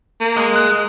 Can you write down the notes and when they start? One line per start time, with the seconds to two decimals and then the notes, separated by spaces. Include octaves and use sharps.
0.21 A#3
0.37 G#3
0.56 F#6